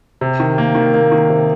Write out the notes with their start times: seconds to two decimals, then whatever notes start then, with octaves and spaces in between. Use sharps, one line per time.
0.21 C3
0.40 D#3
0.58 A#3
0.75 D#3
0.94 A#3
1.12 D#3
1.29 C3